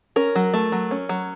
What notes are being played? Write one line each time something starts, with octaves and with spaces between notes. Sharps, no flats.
C#4 A#4
F#3
A3
F#3
C#4
F#3